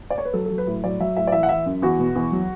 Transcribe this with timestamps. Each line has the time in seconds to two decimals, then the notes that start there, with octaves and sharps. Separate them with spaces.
0.10 D5
0.18 C#5
0.25 B4
0.33 F#3 A4
0.46 F#3 A4
0.58 B4
0.67 A2
0.84 F#3 D5
1.00 F#3 E5
1.17 A2 E5
1.27 D5
1.32 E3 E5
1.43 F#5
1.49 E3 E5
1.66 F#2
1.82 E2 F#4
1.99 B2
2.16 E2
2.32 F#3